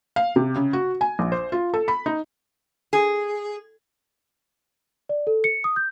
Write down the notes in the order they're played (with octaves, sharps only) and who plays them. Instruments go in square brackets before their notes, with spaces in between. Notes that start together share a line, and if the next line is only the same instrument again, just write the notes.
[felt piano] F5
C3
C#3
F#4
G#5
A#1
C5
F4
A4
B5
D#4
[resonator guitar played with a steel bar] G#4
[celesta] D5
A4
C#7
D#6
G6